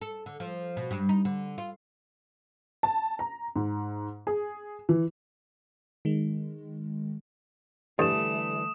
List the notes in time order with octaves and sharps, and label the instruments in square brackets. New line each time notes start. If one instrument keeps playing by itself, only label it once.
[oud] A4
D3
F3
B2
G2
D#4
D3
F4
[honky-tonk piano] A5
A#5
G#2
G#4
E3
[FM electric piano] D#3 G#3
[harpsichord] G2 [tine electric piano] D3 E3 G3 [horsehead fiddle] A3 [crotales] D#6 E7